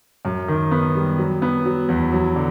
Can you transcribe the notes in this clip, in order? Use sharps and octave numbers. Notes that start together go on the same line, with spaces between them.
F#2
D#3
B3
G3
F#3
B3
F#3
E2
F#3
D3